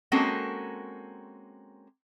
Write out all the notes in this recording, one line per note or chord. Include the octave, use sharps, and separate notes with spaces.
G#3 A#3 C4 C#4 F#4 A4